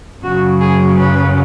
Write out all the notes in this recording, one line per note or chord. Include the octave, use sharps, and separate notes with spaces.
F#2 C#3 F#3 C#4 F#4
G#4
B4